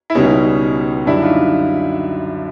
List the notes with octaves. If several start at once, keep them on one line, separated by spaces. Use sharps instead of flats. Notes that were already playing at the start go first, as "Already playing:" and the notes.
E4
C#2 B2 G3 C#4 D#4
F#2 D3 G3 D4 E4
D#4 F4